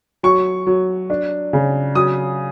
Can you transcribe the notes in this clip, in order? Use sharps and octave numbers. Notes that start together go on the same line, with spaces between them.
F#3 C#6
F#3
D4
C#3
F#3 D#6